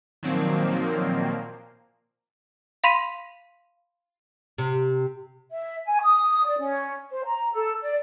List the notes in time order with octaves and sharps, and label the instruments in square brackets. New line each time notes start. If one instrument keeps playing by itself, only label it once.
[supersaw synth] A#2 F3 A#3 [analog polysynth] D#3 F#3 C4
[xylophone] F5 B5 C6 B6 D#7
[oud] C3
[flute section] E5
G#5
D#6
D5
C#4
C5
A#5
A4
D5